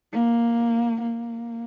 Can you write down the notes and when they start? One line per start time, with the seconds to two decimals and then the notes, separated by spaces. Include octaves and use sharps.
0.12 A#3
1.01 A#3